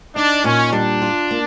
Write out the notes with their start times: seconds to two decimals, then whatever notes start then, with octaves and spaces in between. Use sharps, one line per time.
0.16 D4 D#4
0.44 A#2 C#4
0.73 G3 D4
1.02 F4
1.31 A#3